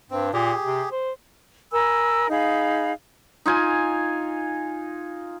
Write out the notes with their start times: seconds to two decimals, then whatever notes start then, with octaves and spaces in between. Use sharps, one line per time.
0.10 G2 C4
0.33 A#2 G4 G#4
0.64 C3
0.92 C5
1.72 A#4 G#5 B5 E6
2.29 D#4 G#4 F5 B5
3.46 D#4 F4 G#5